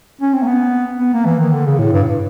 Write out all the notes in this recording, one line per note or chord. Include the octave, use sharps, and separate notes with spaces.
C#4
C4
A#3
B3
B3
A#3
E3
D#3
D3
C#3
A2
G2